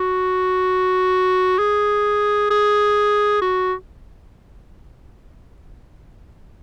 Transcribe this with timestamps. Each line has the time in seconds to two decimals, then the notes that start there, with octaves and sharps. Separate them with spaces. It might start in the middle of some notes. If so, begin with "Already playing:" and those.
Already playing: F#4
1.59 G#4
2.51 G#4
3.41 F#4